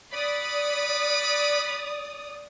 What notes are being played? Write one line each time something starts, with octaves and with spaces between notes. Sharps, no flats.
D5 F#5 B5 D#6